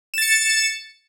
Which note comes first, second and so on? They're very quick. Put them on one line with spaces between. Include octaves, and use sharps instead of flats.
E7 A6 C#7